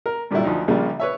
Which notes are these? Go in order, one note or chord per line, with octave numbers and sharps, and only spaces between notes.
A#4
G2 A#2 D3 F#3 G3 E4
D2 F3 D#4
A#1 C#3 G3 A#3 F4
B4 C#5 E5